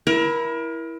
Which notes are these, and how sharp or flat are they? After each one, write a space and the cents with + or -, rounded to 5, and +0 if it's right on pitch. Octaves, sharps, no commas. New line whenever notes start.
E4 +0 A#4 +30